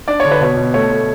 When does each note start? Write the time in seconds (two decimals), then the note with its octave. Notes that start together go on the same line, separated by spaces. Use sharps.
0.08 D4 D5
0.20 D3 C#5
0.31 B4
0.41 B2 C#5
0.57 B2
0.74 A3 C#5
0.90 A3